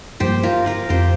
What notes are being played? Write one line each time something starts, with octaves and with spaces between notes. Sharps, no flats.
G2 F3 A#3 G4 C5
F4 A#4
F4 A#4
F2 F3 C4 G4 C5